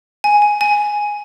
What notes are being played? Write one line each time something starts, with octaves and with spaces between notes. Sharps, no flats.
G#5
G#5
G#5